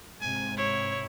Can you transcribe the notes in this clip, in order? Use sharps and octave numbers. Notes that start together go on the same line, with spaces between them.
G#2 C3 G#5
E4 C#5